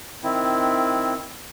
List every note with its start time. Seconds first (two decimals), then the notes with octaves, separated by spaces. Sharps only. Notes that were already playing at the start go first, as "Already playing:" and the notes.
0.23 D#3 C4 E4